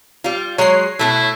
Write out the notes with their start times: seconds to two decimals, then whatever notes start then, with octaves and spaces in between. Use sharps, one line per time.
0.24 G3 F4
0.58 F#3 G#3 C#5 C7
0.99 B2 G#3 A3 E4